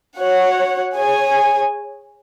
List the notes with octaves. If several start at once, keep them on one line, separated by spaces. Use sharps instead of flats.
F#4 C#5 F#5
G#4 C#5 G#5